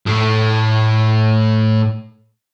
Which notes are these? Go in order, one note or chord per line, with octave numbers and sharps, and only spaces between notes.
A2 A3